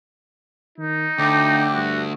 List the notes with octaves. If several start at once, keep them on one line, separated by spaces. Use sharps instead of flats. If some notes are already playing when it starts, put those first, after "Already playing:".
D#3 D#4
D2 D3 G5 D6
G2 F#4